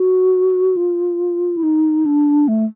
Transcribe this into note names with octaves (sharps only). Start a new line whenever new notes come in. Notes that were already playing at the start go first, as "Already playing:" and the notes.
Already playing: F#4
F4
E4
D#4
D4
A3